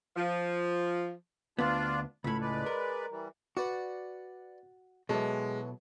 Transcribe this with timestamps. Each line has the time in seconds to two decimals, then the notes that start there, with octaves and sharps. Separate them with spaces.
0.17 F3
1.59 D2 B3 D4 F4 D5
2.24 C#2 A2 B5
2.41 G#3 B4 D5
2.66 A#4
3.10 E3 G3
3.57 F#4 B4 D5 F#5
5.09 B2 E3 F#3 G#3 A4